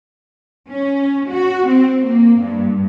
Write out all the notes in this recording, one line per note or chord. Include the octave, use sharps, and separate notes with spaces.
C#4
F#4
C4
A#3
G2